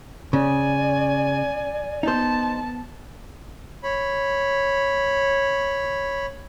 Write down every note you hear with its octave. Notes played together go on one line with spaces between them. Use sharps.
C#3 D5 G#5
B3 D#4 C5 A5
C#5 B5